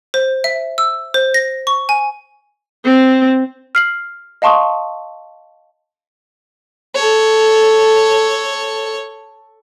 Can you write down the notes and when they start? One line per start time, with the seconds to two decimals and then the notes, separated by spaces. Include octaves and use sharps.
0.14 C5
0.44 E5
0.78 E6
1.14 C5
1.34 A#6
1.67 C#6
1.89 G#5
2.85 C4
3.75 F6 C7 F#7
4.42 D#5 F5 A5 C6 C#6 D#6
6.95 A4 C#5